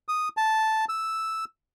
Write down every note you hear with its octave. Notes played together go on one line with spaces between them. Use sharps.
D#6
A5
E6